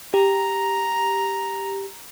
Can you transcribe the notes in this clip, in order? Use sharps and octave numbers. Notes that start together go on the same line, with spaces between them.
G4 A#5